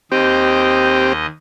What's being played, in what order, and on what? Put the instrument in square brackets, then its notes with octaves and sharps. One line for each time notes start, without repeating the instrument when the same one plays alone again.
[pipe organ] D#2 D#5 [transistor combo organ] C4 G4